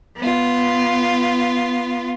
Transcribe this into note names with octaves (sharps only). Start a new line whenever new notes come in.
B3 F4